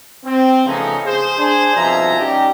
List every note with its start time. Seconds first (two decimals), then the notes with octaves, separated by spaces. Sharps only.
0.25 C4
0.66 C#3 F3 A3 B3 C#4 D#4
1.06 G#4 C5
1.38 D4 G#4 C5
1.76 C2 B2 F3 E5 G#5 A#5
2.19 G3 C#4 D#4 F#4 G4